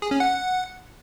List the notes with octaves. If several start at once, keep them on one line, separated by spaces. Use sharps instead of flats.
G#4
C#4
F#5